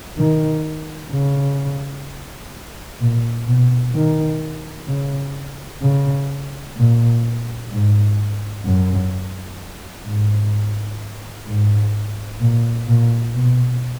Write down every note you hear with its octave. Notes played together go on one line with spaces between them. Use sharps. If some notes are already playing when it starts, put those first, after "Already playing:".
D#3
C#3
A#2
B2
D#3
C#3
C#3
A#2
G#2
F#2
G#2
G#2
A#2
A#2
B2